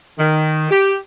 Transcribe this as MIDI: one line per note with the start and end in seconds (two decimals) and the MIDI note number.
0.18 0.70 51
0.71 0.96 67